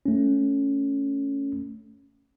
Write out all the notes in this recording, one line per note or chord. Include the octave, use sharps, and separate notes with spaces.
A3 C#4